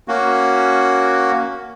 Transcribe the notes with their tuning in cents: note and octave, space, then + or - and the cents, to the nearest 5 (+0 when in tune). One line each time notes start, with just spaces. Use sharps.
A#3 +0 C#4 +0 F#4 +0